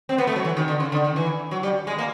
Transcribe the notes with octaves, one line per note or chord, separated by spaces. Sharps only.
C4
B3
A3
F#3
E3
D#3
D3
C#3
D3
D#3
E3
F#3
G3
G#3
A#3